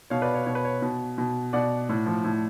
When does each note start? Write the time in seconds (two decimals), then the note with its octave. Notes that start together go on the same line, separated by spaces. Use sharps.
0.10 B2 C#5 F5
0.22 B4 D5
0.34 C#5
0.46 B2 C#5
0.55 B4
0.65 C#5
0.82 B2
1.18 B2
1.53 B2 D5 F#5
1.89 A2
2.06 F3
2.24 A2